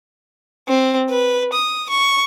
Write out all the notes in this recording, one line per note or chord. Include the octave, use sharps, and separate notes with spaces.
C4
B4
D#6
C#6